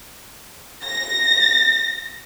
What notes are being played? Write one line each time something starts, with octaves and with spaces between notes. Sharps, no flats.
A#6